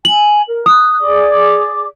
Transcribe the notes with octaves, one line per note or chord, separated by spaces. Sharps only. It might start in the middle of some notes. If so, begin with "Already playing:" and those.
G#5 F#7
A#4
D#6 F#6
G#4 D5 D6